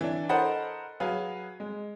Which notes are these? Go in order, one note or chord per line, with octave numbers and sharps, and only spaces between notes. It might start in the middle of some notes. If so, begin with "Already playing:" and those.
E3 D4
A4 A#4 C5 D#5 F#5 B5
F#3 G#4 B4 F5
G#3